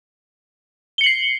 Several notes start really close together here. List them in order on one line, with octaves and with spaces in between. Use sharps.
G7 C#7 F#7 C7